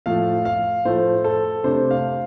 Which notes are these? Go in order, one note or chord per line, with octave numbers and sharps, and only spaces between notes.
A2 F3 A3 F5
F5
A2 F3 A3 C5
A4
C3 A3 D4 C5
F5